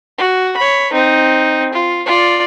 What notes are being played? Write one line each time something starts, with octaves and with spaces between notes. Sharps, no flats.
F#4
C#5 B5
C4 D#4
F4
F4 D5